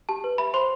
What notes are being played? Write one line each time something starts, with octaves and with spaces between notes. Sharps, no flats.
G4 A5
B4
E5 B5
C5 C6